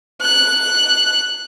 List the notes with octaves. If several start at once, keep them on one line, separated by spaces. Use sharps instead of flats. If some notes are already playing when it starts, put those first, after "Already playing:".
F#6